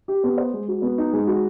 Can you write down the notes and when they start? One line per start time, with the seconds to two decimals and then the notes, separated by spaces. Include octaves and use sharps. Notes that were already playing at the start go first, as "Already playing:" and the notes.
0.08 G4
0.24 B3
0.38 C5
0.53 G#3
0.68 F#4
0.82 B3
0.98 D#4
1.13 G#3
1.27 F#4